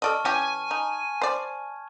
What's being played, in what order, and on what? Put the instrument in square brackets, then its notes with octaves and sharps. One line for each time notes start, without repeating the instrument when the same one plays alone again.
[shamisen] A4 D5 D#5 [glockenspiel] A5 C#6 F6
[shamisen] E3 C#4 G4 [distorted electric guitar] G#5
[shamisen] D#4
C5 D5